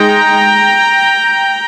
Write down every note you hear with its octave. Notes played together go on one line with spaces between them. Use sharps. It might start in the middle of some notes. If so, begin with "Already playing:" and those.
Already playing: G#3 D#4 G5 A#5